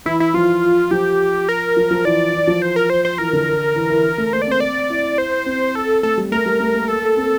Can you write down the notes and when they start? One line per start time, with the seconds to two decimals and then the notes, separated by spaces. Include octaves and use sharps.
0.05 E3 E4
0.20 E4
0.34 F3 F4
0.91 F3 G4
1.49 A#4
1.77 F3
1.91 F3
2.05 E3 D5
2.33 E3
2.47 F3
2.62 C5
2.76 A#4
2.90 C5
3.05 C5
3.18 E3 A#4
3.33 D3
3.76 E3
3.90 E3
4.18 A3
4.33 A#3 C5
4.42 D5
4.47 C4 C5
4.60 D5
4.90 E4
5.18 C5
5.46 C4
5.75 A4
6.03 A3 A4
6.18 G3
6.32 A3 A#4
6.46 G3
6.60 A3
6.75 A#3
6.88 A4
7.17 C4